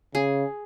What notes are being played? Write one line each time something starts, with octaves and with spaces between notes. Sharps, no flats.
C#3 G#4